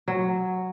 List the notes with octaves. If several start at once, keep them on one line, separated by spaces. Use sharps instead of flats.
F#3